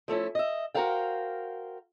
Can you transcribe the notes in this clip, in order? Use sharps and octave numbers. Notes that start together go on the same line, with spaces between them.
F3 A3 C#4 E4
D#5 E5
F#4 G4 A#4 C5 F5 G5